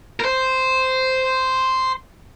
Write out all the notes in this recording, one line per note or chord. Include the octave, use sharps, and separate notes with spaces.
A#4
C5